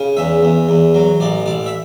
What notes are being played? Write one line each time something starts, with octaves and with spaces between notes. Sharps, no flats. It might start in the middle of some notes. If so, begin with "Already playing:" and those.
Already playing: C#3
E2 E5
E2
E2
F#3
A1 D5
A1 D5
E5